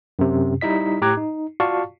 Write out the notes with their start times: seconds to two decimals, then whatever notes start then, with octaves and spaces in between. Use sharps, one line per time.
0.19 F#2 C3
0.61 G3 D#4 E4 D#5 B6
1.01 A2 G4 A#5 D6 F#6 G#6
1.17 D#4
1.60 F4 F#4 D5 F5 A5 C#6